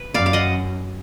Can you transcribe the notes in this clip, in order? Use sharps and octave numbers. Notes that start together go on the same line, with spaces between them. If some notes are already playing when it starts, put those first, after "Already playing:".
Already playing: B4
F#2 D5 F5
F5
D#5 F#5